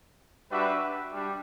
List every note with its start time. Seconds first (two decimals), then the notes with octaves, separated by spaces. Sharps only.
0.51 G3 D4 F#4 B4 E5
1.12 G3 D4